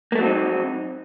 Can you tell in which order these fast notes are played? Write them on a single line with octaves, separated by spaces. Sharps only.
A#3 A3 F#3 C4 D#4